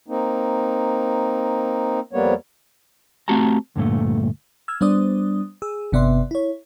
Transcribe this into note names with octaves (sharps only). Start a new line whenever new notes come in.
A#3 C4 D#4
F2 G3 A#3 B3 C#5
A3 C4 F#4 G4 A5 A#5
D2 G2 A#2 A3
E6 F6 G#6
G3 B3 D4 C5 D5 D#6
G#4 E6
G1 C3 B3 D5 E5 C6
E4 C#5